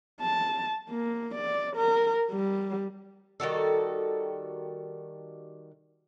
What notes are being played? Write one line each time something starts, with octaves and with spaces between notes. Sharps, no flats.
A5
A#3
D5
A#4
G3
D#3 G3 F#4 A4